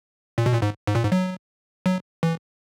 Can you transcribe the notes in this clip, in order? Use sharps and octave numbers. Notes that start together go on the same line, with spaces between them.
A#2
B2
A#2
G#2
G#2
A#2
G#2
F#3
F#3
E3